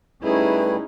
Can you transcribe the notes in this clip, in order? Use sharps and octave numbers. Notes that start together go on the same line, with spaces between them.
G3 A3 C#4 D#4 E4 G#4 B4